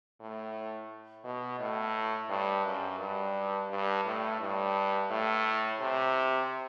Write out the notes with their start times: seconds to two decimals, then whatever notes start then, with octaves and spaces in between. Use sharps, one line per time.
0.20 A2
1.25 B2
1.59 A2
2.30 G2
2.65 F#2
3.00 G2
3.71 G2
4.05 A2
4.41 G2
5.10 A2
5.80 C3